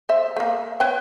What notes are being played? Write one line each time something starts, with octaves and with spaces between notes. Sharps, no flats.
C5 E5
A3 A#3
B4 C#5 G5